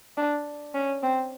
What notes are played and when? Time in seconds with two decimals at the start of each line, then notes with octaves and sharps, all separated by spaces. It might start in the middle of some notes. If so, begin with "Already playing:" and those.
0.17 D4
0.75 C#4
1.03 C4